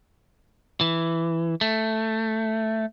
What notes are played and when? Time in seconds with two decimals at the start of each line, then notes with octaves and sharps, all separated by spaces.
0.81 E3
1.61 A3